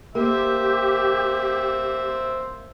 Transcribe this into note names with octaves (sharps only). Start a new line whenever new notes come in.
A#3 G4 C5 E5